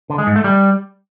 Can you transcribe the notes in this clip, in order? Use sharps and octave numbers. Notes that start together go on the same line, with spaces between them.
D3
G#3
G#2
A3
G3